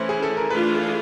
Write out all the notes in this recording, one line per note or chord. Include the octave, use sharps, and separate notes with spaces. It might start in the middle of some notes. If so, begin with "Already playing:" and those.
Already playing: E3 A3 C#4 E4 C5
G#4
A4
A#4
E3 A3 D4 F4 G#4 B4